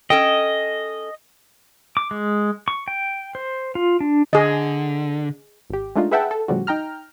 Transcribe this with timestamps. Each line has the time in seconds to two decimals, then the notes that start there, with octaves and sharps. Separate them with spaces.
0.10 C#4 A4 D#5 G5
1.97 D6
2.11 G#3
2.68 C#6
2.88 G5
3.35 C5
3.75 F4
4.00 D4
4.33 D3 G#4 D#5
5.70 G#1 G4
5.96 G#3 A3 D4 D#4 F4
6.11 G#4 B4 E5 F#5 G5 A5
6.31 A4
6.48 A2 C#3 F3 G3 F#4
6.67 D#4 G5 A#5 F6